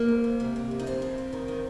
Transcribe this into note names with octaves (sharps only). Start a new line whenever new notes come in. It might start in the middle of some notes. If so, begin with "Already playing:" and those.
Already playing: A#3
G#2
G#2
C3
C3
F2
D#4
F2 C4
F2
F2
D#3
D#3